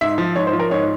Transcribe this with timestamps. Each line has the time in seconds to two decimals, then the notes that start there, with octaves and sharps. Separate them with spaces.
0.01 G#2 E5
0.18 F3
0.36 G#2 C#5
0.47 C5
0.53 F3
0.59 A#4
0.71 G#2 C#5